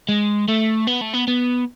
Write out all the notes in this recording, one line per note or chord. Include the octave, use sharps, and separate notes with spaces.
G#3
A3
B3
A3
B3
B3